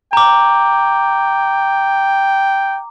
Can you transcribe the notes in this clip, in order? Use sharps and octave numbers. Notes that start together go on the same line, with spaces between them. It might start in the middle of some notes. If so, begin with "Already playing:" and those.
G5 A#5 D6